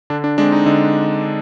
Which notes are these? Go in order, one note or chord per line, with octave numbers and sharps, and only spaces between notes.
D3 D4
D4
G#3 C4 D4
D#4
D3 D#4